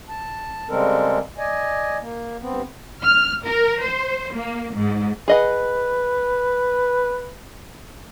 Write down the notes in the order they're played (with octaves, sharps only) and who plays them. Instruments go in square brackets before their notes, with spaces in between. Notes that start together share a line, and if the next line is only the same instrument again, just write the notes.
[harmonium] A5
C#3 G3 G#3 C4 A4 A#4
D5 D#5 G#5
A#3
G2 B3 C4
[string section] F6
A#4
C5
A#3
G#2
[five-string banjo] G#4 D#5 F#5 [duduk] B4